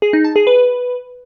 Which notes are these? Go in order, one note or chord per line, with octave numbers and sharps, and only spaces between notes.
G#4
D#4
A5
G#4
B4